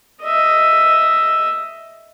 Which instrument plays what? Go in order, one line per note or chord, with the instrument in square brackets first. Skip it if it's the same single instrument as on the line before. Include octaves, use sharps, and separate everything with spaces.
[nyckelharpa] D#5 E5